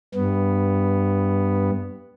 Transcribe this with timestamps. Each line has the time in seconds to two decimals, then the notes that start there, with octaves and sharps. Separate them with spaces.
0.15 G2 B3